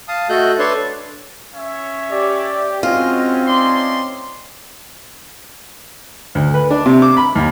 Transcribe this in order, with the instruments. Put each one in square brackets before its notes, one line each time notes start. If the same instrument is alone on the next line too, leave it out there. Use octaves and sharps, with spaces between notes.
[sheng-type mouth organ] F5 A5 D#6
A3 F#4 A4 D#5 F#6 G6
D4 A4 B4 C#5 A5 C6
[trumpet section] C#4 C#5 E5
[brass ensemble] G4 [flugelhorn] D5
[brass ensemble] G#3 F#4 D#5 [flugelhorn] C4 [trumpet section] C#4 [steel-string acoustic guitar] F4
[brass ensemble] A3 C#4 D#4 [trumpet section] D5 D#5 C6
[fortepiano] D2
B4
D4
C3
D6
B5
D#2